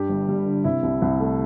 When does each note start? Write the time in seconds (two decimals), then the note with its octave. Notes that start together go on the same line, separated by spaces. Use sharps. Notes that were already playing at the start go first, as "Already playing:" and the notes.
Already playing: G2 G4
0.09 G1
0.28 G3
0.46 D3
0.64 C3 E4
0.83 C2
1.02 C2
1.20 A3